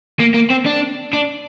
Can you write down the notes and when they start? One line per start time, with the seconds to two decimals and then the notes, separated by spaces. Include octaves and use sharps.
0.20 A#3
0.34 A#3
0.50 C4
0.66 D4
1.13 D4